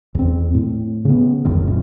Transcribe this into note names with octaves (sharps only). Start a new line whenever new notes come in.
E2 C4
A2
C#3 B3
F1 C#2 F#2 D#3
F#2 A#2